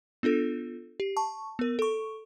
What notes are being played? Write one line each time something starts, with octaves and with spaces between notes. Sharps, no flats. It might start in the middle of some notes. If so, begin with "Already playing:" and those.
B3 D4 F4 A4
G4
A5 C#6
B3 A#4
A4 C#6